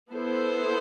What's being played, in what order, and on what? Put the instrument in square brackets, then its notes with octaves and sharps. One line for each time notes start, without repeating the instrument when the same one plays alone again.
[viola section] B3 E4 A4 C5